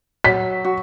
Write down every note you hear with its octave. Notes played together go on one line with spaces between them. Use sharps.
F#3 B6
F#4